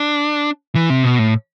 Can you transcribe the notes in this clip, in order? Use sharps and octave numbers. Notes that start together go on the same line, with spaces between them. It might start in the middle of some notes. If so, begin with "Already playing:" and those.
Already playing: D4
E3
C3
B2
A2